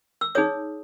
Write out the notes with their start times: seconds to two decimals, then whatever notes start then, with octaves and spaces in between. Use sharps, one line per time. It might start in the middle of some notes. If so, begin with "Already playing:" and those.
0.21 E6
0.35 D#4 G#4 C#5 D#6